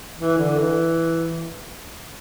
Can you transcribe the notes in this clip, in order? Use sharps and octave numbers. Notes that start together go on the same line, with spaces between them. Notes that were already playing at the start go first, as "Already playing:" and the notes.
E3
D3
E3